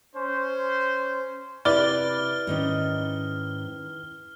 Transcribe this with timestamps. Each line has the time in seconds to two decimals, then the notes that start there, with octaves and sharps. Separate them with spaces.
0.15 C#4 C5
1.65 C3 E4 B4 D5 F6 G7
2.47 G#2 D#3 C#4